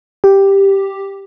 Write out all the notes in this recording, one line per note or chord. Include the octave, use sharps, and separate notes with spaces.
G4